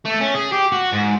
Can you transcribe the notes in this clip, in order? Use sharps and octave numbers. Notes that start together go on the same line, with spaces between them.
A3
C#4
G#4
G4
F#4
G#2